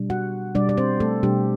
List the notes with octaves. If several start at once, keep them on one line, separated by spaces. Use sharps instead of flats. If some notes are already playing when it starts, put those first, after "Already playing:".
Already playing: B2 G3 D4
F#4 F#5
B2 G3 D4 D5
D5
C4 C5
A3 A4
B2 G3 D4 G4